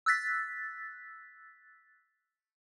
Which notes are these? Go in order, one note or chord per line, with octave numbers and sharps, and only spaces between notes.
E6 F#6 A6 B6